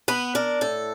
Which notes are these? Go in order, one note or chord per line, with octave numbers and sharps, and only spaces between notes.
B3 B4
D4 A#4
A2 A4